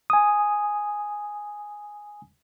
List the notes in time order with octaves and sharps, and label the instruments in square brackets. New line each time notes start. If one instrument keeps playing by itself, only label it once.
[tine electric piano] G#5 D#6